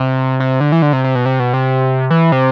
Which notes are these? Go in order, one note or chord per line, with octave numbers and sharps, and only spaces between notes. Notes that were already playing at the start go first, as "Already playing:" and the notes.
Already playing: C3
C3
D3
E3
D3
C3
C3
B2
C3
B2
C3
E3
C3